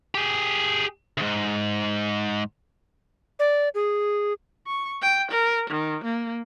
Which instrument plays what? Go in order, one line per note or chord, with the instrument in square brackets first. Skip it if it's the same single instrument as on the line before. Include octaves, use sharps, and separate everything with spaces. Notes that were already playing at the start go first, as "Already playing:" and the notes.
[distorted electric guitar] G4 G#4
D2 G#2
[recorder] D5
G#4
[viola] C#6
G5
A#4
D#3
A#3